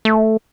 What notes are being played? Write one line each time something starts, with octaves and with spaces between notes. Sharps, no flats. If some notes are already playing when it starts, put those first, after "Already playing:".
A3